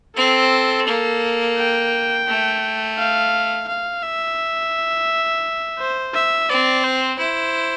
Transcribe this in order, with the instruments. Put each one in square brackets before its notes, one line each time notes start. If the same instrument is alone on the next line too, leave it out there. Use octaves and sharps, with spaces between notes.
[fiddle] C4 [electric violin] A4
[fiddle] A#3
[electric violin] G5
[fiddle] A3
[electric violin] F5
F5
E5
C5
E5
[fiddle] C4 [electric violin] D5
[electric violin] C5
[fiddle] E4 [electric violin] C5